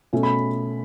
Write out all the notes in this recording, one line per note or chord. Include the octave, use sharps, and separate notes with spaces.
B2 A3 C#4
B5